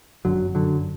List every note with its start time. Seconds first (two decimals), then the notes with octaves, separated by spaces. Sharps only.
0.25 G1 F#2 D3 F#3
0.55 D3 F#3